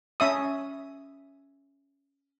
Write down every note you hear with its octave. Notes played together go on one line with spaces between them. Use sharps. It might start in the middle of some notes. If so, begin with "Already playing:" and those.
C#4 E5 D#6